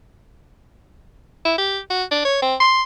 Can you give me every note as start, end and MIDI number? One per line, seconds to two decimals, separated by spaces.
1.45 1.56 64
1.58 1.79 67
1.90 2.04 66
2.11 2.22 62
2.25 2.38 73
2.42 2.55 60
2.60 2.82 84